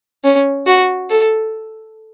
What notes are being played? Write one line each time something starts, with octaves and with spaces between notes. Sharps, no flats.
C#4
F#4
A4